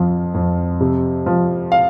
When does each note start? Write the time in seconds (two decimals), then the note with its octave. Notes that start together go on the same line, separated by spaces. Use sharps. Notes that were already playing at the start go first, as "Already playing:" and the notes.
Already playing: F2 F3
0.34 F2
0.80 C3
1.26 F3
1.72 F5